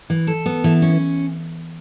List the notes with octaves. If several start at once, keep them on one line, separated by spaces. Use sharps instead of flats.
E3
A4
B3
E3
C#4